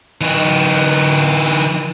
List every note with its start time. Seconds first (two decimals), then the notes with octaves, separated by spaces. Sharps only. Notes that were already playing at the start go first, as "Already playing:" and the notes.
0.21 E3 D#4